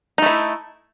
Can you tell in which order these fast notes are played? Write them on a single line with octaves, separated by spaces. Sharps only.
D#4 A3 E4